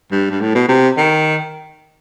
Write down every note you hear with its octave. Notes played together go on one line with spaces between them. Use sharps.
G2
G2
A2
B2
C3
D#3